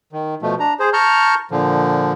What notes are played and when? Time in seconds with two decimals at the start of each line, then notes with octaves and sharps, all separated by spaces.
0.13 D#3
0.42 B2 F3 A3
0.59 D4 A#5
0.80 G#4 C5
0.93 A5 A#5 C#6 F6 G6
1.51 A#2 D3 F3